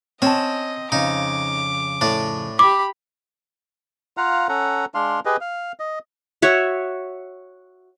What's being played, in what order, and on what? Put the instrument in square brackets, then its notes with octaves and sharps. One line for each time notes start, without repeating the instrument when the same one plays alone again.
[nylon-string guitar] C4 A5 [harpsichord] C#4 [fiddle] D#5
[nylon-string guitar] F2 C#3 [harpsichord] D#4 [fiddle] D6
[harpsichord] A2 D4
[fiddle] G4 B5 [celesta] D6
[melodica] F4 F5 F#5 A#5
C#4 A4 F#5 A#5
G#3 D4 F5 C6
G4 G#4 B4 D#5
F5
D#5
[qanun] F#4 C#5 E5 F#5